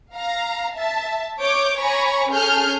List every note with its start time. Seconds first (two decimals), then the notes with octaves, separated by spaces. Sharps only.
0.14 F5 A#5
0.75 E5 A5
1.40 C#5 D6 G6
1.79 C#5 G#5 A#5 B5 C#6
2.31 C#4 G#4 A4 F6 G6